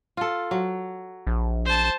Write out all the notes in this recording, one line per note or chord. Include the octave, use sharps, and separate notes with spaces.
F4 A4
F#3
A#1
C5 A5